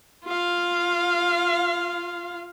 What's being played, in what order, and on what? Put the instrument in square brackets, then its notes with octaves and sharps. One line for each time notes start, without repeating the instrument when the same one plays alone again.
[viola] F4 F5